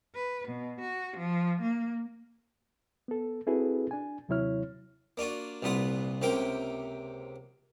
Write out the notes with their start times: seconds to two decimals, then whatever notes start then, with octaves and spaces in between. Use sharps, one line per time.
0.14 B4
0.47 B2
0.80 F#4
1.15 F3
1.61 A#3
3.08 B3 A4
3.47 C4 E4 F#4 G#4 A4 B4
3.91 D4 G#5
4.29 D#2 C3 F#3 E4 C#5 F6
5.17 A#3 D4 F4 F#4
5.62 C2 A#2 B3 F4 F#5
6.22 C#2 C3 A#3 A#4 G5 D6